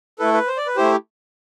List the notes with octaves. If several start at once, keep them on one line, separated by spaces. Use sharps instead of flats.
A3 E4 A4 B4
B4
C5
D5
B4
A3 E4 G4 C5